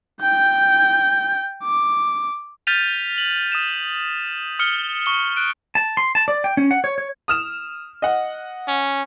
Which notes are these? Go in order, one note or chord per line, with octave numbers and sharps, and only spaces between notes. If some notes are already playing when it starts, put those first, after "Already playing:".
G5 G6
D6
F6 G6 A6 B6 D#7 F7
F#7
D#6 D#7 E7
D#6 F6 C#7 G7
C#6 G7
F#6 D7
A5
C6
A5
D5
G5
C#4
F#5
C#5
C#5
D#6 F6 E7
D#5 F#5
C#4